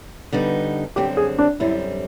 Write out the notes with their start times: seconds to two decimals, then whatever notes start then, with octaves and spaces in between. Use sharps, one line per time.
0.32 D3 G3 B3 D#4
0.96 F#2 D3 G3 C4 G4
1.17 G#4
1.39 D4
1.60 F#2 D3 G3 C4 E4